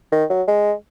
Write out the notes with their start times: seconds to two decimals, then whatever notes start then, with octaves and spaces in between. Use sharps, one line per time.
0.12 D#3
0.30 F#3
0.47 G#3